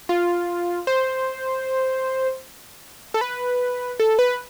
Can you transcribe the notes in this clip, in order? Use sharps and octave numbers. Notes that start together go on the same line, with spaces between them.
F4
C5
A4
B4
A4
B4